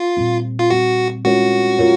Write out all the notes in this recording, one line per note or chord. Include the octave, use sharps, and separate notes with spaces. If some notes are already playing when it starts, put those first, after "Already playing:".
Already playing: F4
A#2 G3 C4
F4
A#2 G3 C4 F#4
G#3 C#4 F4 F#4 A#4 C#5
F4 A#4 C#5